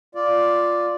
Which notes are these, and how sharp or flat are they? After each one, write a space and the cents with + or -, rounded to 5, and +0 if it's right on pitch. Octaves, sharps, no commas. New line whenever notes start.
F4 +0 D5 +0